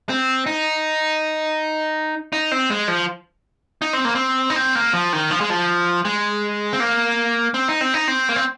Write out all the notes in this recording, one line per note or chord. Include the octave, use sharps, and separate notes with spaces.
C4
D#4
D#4
C4
G#3
F3
D#4
C4
A#3
C4
D#4
C4
A#3
F3
D#3
F3
G#3
F3
G#3
C4
A#3
C4
D#4
C4
D#4
C4
A#3
C4